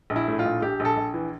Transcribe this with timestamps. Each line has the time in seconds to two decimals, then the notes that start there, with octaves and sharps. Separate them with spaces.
0.10 A#1
0.16 E4
0.28 A2
0.39 F4
0.45 A#1
0.62 A#1 G4
0.80 A#1
0.85 A4
0.97 A#1
1.14 E3